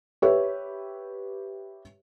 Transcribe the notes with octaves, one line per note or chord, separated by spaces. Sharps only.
G4 B4 C#5 E5